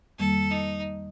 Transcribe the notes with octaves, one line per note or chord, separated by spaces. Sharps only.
F2 D#3 G3 A#3 A4
D#4